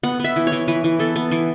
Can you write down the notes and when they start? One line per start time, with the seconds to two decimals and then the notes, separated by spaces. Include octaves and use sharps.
0.03 B3 F#5
0.20 B3 E5
0.36 E3
0.47 C#5
0.52 E3
0.68 E3 B4
0.84 E3
0.99 B3 A4
1.16 B3
1.32 E3